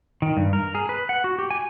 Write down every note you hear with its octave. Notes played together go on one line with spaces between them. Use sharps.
D#3
G2
A#4
G#4
B4
F#5
F#4
G4
G#5